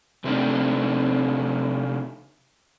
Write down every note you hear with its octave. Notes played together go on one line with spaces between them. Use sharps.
C3 A3 C4 D4 D#4